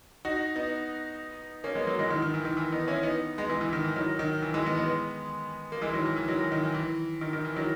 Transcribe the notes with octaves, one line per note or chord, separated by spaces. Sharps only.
D#4 F#4
B3 D#4
A#3 C#4
G#3 B3
F#3 A#3
E3 G#3
D#3
D#3
E3
D#3
E3
B3 D#4
C#4 E4
B3 D#4
G#3 B3
E3 G#3
E3
D#3
E3
D#3 F#3
D#3
E3
E3 G#3
G#3 B3
G#3 B3
A#3
E3 G#3
D#3 F#3
E3
E3
D#3 F#3
E3
D#3
E3
E3
D#3
D#3
E3
D#3 F#3